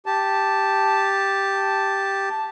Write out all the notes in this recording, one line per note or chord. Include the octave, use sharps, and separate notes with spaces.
G4 A5